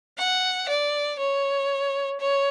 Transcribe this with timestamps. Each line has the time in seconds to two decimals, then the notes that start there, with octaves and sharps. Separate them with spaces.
0.18 F#5
0.69 D5
1.18 C#5
2.20 C#5